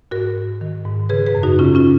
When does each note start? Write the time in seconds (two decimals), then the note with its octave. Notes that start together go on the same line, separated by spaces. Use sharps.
0.11 G#2 F#4 A#4
0.36 G#2
0.61 D#3
0.85 G#2
1.09 C#3 G#4 B4
1.27 G#4 B4
1.35 F#2
1.43 D#4 F#4
1.59 C#3 C#4 F4
1.75 C#4 F4